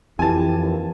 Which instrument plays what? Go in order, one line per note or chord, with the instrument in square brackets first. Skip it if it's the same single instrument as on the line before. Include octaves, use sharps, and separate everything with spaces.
[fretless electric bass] F2 E3 [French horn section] E4 G4 [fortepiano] G#5 A5
[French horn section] D#2 F4